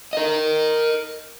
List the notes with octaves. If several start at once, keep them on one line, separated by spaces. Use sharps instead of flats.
A#4 D#5